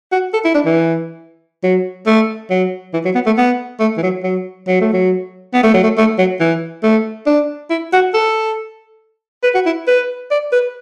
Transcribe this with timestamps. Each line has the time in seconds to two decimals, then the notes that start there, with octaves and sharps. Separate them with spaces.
0.12 F#4
0.34 A4
0.45 E4
0.55 D4
0.65 E3
1.63 F#3
2.06 A3
2.50 F#3
2.93 E3
3.05 F#3
3.15 B3
3.26 A3
3.38 B3
3.80 A3
3.98 E3
4.03 F#3
4.23 F#3
4.68 F#3
4.81 A3
4.93 F#3
5.54 B3
5.63 A3
5.74 F#3
5.83 A3
5.98 A3
6.18 F#3
6.40 E3
6.83 A3
7.27 D4
7.70 E4
7.93 F#4
8.14 A4
9.43 B4
9.55 F#4
9.66 E4
9.87 B4
10.31 D5
10.52 B4